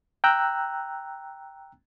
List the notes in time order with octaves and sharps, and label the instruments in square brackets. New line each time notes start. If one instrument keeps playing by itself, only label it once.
[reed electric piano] G5 A#5 E6 F#6